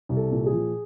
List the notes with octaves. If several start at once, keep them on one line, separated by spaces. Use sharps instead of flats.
C2
A4
A#2
G#4
F3